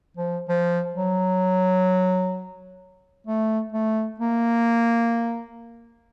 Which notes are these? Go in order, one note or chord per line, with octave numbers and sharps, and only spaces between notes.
F3
F3
F#3
A3
A3
A#3